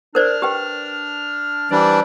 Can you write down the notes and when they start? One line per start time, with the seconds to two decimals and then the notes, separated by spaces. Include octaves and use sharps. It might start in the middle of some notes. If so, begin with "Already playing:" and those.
0.15 D4 A#4 C5 D5 F6
0.42 G4 B4 G5
1.71 E3 G3 D4 E4 C5 D5